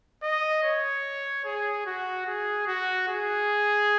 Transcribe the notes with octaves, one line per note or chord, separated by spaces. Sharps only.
D#5
C#5
G#4
F#4
G#4
F#4
G#4